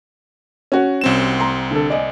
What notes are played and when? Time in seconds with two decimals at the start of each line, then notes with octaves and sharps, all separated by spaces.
0.72 C#4 F#4
1.01 C2 C4 E7
1.40 A#5 C6
1.71 D3 A4
1.90 D5 D#5 G#5